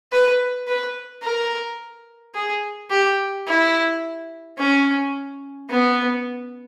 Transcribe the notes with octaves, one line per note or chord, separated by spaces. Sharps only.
B4
B4
A#4
G#4
G4
E4
C#4
B3